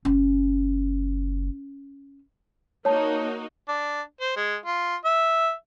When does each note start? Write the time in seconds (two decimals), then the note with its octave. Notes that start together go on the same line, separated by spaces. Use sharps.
0.05 F#1 C#4
2.85 A#3 D#4 F#4 C#5 A5
3.69 D4
4.20 C5
4.37 G#3
4.65 F4
5.05 E5